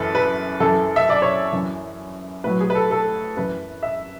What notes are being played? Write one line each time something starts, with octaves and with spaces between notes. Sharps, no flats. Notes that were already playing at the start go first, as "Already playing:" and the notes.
Already playing: F#2 E3 A4 B4
B4
F#2 E3 A4
E5
D5
C#5
F#2 E3
A2 F#3 B4
G#4
B4
A4
A4
F#2 E3 B4
E5